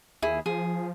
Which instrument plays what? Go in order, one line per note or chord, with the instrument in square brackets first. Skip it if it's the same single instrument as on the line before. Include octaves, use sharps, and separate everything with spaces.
[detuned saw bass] D#2 [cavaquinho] E4 G#4
[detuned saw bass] F3 [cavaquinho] G#4